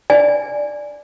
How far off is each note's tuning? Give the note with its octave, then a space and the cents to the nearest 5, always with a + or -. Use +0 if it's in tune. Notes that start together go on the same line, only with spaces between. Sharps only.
D5 +0 G#5 +0